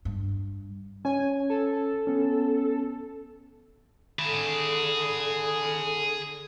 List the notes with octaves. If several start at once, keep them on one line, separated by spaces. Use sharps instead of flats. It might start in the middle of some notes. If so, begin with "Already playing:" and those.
G2
C#4 C#5 G#5
A4
B3 C#4
D3 G#4 B5